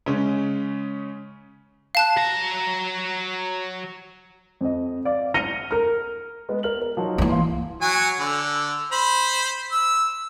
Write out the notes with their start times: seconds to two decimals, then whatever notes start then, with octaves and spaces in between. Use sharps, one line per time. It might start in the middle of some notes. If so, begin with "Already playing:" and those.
0.06 C#3 G#3 C#4
1.95 F5 A5 F#6
2.17 F#3 A#5
4.61 F2 D#5
5.05 D5 F5
5.34 F6 A#6 C#7 D#7 F7 G7
5.71 A#4 F6
6.49 G#3 B3
6.63 A#4 F6 F#7
6.81 A#4
6.97 F3 F#3 D#4
7.18 E3 A#3
7.29 F5 C6
7.82 F#3 F#4 G#5
8.19 D3
8.92 C5 B5
9.72 E6